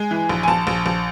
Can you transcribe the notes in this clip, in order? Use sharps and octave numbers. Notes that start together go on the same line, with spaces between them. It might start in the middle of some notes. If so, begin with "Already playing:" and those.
Already playing: G#3 G#5
E3
A#1
G#5
A#1 A5
A#1
A#1